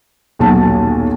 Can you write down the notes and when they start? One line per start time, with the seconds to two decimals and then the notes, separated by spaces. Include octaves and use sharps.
0.39 D#1 B1 F#3 A5